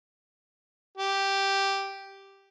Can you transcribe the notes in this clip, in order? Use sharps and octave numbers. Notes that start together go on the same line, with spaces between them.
G4